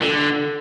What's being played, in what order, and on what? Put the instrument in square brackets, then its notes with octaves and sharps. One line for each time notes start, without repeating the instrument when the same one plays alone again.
[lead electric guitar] D3 [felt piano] A4